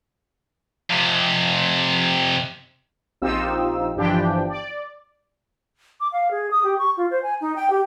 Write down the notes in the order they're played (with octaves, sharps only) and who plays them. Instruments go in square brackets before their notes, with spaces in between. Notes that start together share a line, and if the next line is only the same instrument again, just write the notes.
[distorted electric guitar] F2 C3
[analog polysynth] A#1 C4 D#4 F4 G4 E6
G1 E3 F3 D4 G4 G5
D5
[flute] D6
F5
G#4
D#6
G4
C#6
F4
C5
G#5
D#4
G5
G4